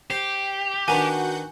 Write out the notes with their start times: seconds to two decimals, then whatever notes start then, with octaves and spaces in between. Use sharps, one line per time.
0.10 G4 C5
0.88 D#3 B3 D4 F#4 F#5 G#5 A#5 G6